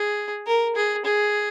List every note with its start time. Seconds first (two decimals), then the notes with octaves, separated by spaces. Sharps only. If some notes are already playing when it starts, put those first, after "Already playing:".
Already playing: G#4
0.47 A#4
0.76 G#4
1.05 G#4